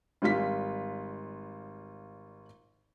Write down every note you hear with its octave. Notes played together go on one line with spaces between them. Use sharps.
G#1 G3 F4 B6